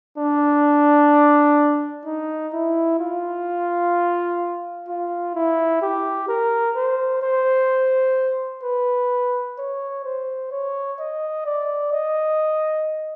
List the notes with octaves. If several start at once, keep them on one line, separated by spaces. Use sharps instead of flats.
D4
D#4
E4
F4
F4
E4
G4
A#4
C5
C5
B4
C#5
C5
C#5
D#5
D5
D#5